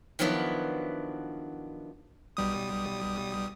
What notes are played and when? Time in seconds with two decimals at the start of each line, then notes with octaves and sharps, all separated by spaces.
0.19 D#3 F3 F#3 B3 D4 E4
2.37 B1 G3 D#6